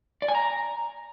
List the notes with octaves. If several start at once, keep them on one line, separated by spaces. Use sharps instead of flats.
D5
G#5
A#5